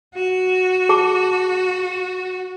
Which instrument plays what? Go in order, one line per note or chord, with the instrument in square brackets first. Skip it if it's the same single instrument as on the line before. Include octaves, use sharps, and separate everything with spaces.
[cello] F#4
[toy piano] G#4 A5 D6